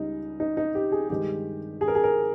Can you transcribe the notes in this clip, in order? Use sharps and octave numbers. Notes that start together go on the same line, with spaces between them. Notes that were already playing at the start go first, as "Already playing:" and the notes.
Already playing: C#2 C#3 G3 D#4
D#4
D#4
G4
G#4
G2 D#3 G#3 G4
G#4
A#4
G#4
A#4